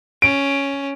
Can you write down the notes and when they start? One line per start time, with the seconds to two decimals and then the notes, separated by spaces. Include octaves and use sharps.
0.22 C#4 D7